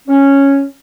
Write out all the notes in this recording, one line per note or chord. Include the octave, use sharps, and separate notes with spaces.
C#4